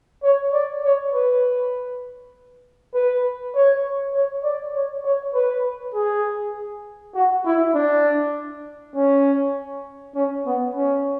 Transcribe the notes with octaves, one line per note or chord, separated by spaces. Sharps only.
C#5
D5
C#5
B4
B4
C#5
C#5
D5
C#5
C#5
B4
G#4
F#4
E4
D4
C#4
C#4
B3
C#4